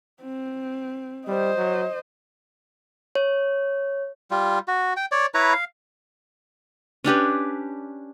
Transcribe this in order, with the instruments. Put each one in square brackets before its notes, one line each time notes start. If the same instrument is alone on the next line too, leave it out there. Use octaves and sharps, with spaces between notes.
[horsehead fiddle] C4
[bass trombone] G3 [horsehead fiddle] C5 D#5
[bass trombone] F#3
[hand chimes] C#5
[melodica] G3 F4
F#4
G5
C#5 D5
E4 B4 C#5 A#5
F5
[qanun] C#4 D4 G4 B4